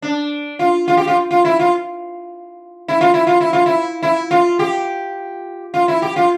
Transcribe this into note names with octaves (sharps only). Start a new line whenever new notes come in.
D4
F4
F4
G4
F4
F4
E4
F4
E4
F4
E4
F4
E4
F4
E4
E4
F4
G4
F4
E4
G4
F4